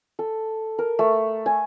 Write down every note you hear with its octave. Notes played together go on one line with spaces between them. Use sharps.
A4
A#4
A3
G#5